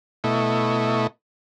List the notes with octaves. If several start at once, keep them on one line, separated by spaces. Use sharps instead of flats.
B2 A3 E4 D#5 C#6